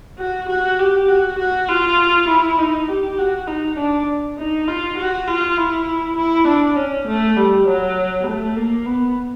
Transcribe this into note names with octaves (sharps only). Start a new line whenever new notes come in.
F#4
F#4
G4
F#4
F#4
F4
E4
D#4
G4
F#4
D#4
D4
D#4
F4
F#4
F4
E4
E4
D4
C#4
A3
G3
F#3
A3
A#3
B3